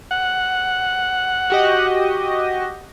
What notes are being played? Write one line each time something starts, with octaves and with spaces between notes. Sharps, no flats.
F#5
F#4 G4 D#5